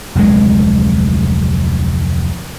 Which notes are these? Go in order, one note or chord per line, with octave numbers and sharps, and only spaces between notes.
F1 D2 F#3 G#3